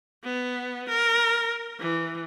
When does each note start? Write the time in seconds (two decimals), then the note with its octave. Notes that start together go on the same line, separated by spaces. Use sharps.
0.24 B3
0.89 A#4
1.79 E3